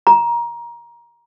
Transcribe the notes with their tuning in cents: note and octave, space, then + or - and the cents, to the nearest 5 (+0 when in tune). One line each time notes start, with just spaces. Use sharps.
A#5 +20